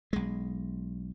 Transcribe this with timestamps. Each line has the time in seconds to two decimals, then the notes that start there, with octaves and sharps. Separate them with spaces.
0.13 B1 G#3